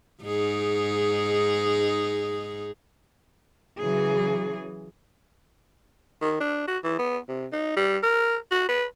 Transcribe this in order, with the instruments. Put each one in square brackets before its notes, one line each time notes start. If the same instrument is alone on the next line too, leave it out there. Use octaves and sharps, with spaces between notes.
[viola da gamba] G#2 D#4 G#4
[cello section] C#3 E3 F#3 G#4
[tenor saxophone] D#3
D4
F#4
E3
B3
C3
D#4
G3
A#4
F#4
B4